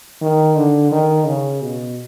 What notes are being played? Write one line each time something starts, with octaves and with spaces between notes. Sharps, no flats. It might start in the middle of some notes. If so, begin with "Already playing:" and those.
D#3
D3
D#3
C#3
B2